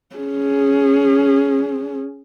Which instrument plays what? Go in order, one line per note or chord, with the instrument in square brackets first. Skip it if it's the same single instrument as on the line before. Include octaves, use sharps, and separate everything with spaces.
[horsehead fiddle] C#4 G#4